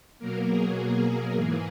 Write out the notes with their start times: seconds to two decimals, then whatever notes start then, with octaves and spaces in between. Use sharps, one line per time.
0.19 B2 F#3 A#3 A#4
0.48 G#4
0.76 G#4
1.33 G#2 E3 A#3